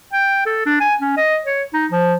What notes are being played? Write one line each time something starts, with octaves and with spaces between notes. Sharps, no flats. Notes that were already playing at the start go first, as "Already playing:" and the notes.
G5
A4
D4
G#5
C#4
D#5
C#5
D#4
F3